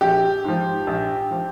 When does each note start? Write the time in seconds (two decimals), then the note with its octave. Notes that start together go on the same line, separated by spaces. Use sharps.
0.01 A#1 G4
0.44 G#2 F3
0.87 A#1
1.31 F3